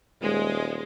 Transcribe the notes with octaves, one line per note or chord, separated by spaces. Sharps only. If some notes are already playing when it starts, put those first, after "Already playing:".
D#1 G#3